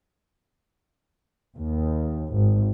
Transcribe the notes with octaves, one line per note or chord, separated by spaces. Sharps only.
D#2
G#1